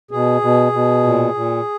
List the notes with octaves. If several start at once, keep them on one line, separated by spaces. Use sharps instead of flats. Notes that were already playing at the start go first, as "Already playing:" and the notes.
B2 G#4
B2
B2
A#2
A#2